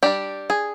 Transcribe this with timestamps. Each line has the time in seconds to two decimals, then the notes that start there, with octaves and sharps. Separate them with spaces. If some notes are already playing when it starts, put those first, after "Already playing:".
0.03 G3 D4 G4
0.50 G#4